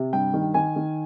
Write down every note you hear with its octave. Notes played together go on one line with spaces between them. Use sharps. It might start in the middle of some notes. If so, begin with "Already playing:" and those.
Already playing: C3
G2 G5
D#3
D#3 G#5
D#3